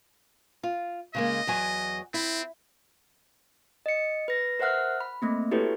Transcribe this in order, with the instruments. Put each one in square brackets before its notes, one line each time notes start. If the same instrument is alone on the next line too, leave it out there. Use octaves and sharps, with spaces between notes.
[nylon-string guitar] F4
[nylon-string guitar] C#3 G#3 A#3 [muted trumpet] D#5
[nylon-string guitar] E2 F#3 G#5
[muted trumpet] C4 [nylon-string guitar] E4
[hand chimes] D#5 C#7
B4 A#6
A#4 C5 E5 F#5 F6 F#6
B5
A3 A#3 C4
E4 F#4 G4 A4 B4 C#5